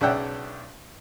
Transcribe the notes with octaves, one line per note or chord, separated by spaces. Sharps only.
B1 C#3 D4 E5 F#5 G5